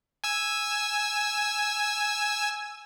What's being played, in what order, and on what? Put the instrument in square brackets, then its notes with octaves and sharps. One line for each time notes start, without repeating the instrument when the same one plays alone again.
[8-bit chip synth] G#5 E6